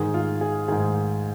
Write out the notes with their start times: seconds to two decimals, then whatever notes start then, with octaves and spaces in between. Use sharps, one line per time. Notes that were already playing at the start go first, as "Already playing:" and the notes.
Already playing: G#2 D#3 G#4
0.14 F4
0.41 G#4
0.68 G#2 D#3 G#4